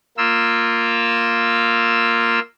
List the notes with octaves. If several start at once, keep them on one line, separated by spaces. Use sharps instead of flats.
A#3 F4 E6